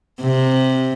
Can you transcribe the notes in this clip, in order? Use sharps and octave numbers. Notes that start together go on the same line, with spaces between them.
C3